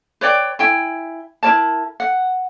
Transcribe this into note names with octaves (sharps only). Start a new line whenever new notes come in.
B4 C#5 D5 G5
E4 G5 G#5
E4 A#4 C#5 A5
F#5